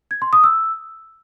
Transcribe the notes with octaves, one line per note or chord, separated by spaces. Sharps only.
G#6
C6
D#6
E6